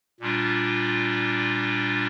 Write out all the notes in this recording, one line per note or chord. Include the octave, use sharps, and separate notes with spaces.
A#2 G3 D4 F4